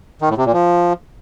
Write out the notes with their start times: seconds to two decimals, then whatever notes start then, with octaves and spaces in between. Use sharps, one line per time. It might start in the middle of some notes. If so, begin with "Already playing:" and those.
0.22 D#3
0.30 A2
0.37 C3
0.45 A#2
0.53 F3